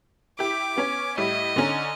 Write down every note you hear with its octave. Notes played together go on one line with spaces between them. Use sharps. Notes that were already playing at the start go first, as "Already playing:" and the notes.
E4 G4 D6
B3 C#4 C#5
A2 G3 E4 D#5
D3 C#4 D#4